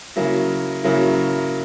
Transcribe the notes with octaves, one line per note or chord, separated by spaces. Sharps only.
C#3 F#3 A#3 E4
C#3 F#3 A#3 E4